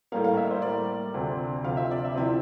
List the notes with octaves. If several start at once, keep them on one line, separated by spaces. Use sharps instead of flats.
A2 G3 A#3 F5
F5
E5
C5
A2 G3 A#3 D5
D2 C3 F3
D2 C3 F3 F5
E5
D5
E5
C3 F3 C4 E4